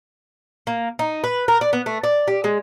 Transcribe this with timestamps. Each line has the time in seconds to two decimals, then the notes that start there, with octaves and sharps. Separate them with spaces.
0.67 A#3
0.99 D#4
1.24 B4
1.48 A#4
1.61 D5
1.73 B3
1.86 A3
2.04 D5
2.28 G4
2.44 G#3